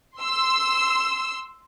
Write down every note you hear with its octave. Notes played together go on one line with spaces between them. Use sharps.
C6 E6